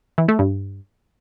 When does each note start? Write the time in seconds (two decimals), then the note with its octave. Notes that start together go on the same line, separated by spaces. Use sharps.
0.18 E3
0.28 A3
0.39 G2